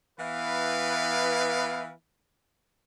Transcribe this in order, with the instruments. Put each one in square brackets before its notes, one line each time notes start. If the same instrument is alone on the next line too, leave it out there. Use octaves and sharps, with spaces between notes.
[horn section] E3 B3 E4 B4 F5